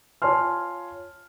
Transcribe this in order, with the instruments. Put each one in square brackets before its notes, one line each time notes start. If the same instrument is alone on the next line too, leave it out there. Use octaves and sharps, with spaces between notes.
[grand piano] F4 C#5 G#5 A5 C6 F6